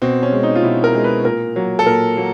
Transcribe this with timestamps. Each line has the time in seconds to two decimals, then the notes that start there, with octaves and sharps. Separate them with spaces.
0.02 B2 C4
0.23 C#4
0.32 G#3
0.43 D#4
0.55 F4
0.63 B2 E4
0.84 A#4
0.94 G#3
1.04 B4
1.25 A#2 A#4
1.56 F#3 A#3
1.79 A4
1.86 A#2 A#4
2.17 F#3 A#3